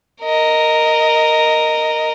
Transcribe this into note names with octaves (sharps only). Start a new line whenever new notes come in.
A#4 D#5